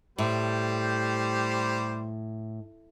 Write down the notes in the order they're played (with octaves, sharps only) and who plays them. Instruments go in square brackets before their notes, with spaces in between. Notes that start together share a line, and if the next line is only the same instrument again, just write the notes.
[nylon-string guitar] A2 [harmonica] G3 G4 C5